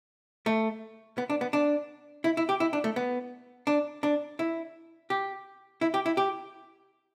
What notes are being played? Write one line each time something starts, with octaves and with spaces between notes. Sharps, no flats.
A3
B3
D4
B3
D4
E4
E4
G4
E4
D4
A3
B3
D4
D4
E4
G4
E4
G4
E4
G4